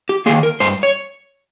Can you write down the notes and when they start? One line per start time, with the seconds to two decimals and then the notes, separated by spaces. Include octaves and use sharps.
0.09 G4
0.26 D#3 A#3 G#4
0.43 A#4
0.60 G2 C5
0.83 C#5